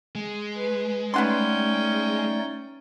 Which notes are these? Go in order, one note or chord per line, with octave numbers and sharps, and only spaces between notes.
G#3
B4
A3 B3 C#4 D#4 D5 F#5 G5 C6